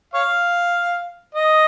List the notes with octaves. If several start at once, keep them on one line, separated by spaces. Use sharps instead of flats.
C#5 F5
D#5